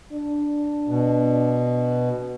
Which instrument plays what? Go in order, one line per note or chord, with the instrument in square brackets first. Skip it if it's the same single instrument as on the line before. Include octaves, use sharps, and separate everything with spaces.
[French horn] D4
[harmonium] B2